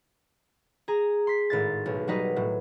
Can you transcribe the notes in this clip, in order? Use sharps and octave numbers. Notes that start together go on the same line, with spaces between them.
G#4 A#5
C6 B6
G#1 A2 A6
B1
F#3 G3 D#4 B4 D#5
A2 F#3